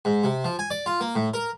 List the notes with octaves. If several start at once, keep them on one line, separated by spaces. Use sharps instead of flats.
G#2
C3
F3
G#5
D5
F4
A#3
A2
A#4